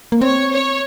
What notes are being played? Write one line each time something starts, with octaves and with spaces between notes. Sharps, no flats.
A#3
C4 C#5
C#5